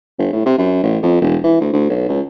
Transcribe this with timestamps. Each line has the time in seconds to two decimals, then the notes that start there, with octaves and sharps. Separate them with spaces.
0.19 G1
0.32 A2
0.46 C3
0.58 F#2
0.83 A1
1.02 F2
1.21 E1
1.44 E3
1.60 D2
1.73 D2
1.90 B1
2.09 C#2